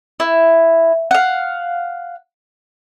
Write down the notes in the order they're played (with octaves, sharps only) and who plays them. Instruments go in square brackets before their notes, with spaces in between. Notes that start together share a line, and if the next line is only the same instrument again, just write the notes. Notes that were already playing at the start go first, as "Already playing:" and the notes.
[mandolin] E4
F5 F#5